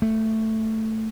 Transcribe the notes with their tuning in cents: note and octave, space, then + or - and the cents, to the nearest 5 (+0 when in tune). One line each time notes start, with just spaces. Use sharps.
A3 +5